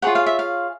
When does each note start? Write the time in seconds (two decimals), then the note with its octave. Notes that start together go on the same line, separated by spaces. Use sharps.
0.02 F4 G#4 C#5 F#5
0.15 F5
0.26 E5
0.39 F5